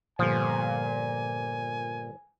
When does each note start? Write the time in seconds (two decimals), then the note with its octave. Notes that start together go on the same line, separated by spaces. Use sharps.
0.19 G1 A#2 F3 G#5